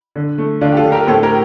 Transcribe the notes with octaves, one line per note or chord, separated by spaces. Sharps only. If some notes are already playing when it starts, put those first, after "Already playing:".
D3
A3
D3 D4 F4
G4
F4 A4
D3
G4 A#4
A2 A4 C5
G4 A#4